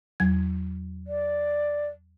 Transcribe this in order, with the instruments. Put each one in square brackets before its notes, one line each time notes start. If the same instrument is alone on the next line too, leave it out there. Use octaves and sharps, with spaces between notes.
[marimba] E2 F#3 G#6
[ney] D5